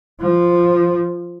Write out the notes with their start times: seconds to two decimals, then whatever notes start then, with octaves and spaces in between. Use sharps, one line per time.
0.20 F3